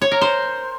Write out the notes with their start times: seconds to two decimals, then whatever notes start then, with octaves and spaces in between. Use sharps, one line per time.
0.02 C#5
0.11 A#4
0.21 C5